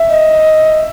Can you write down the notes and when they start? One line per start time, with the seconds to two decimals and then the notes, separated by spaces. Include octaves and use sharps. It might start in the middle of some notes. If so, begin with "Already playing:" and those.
Already playing: E5
0.09 D#5